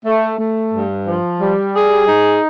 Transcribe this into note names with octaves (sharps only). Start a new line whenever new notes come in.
A3
A3
G2
F3
G3
G#4
D#4